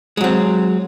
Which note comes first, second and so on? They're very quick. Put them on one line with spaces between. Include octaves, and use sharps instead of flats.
G#3 F#3 C4